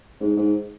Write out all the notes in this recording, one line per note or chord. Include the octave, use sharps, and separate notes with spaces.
G#2
G#2